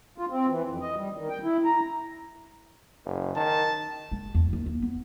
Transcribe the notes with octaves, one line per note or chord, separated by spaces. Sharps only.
F4
C4
E3
F2
D#5
G3
D#3
G5
E4
A#5
F#1
D#3 A5
G#3
E2
D#2
A#3
B3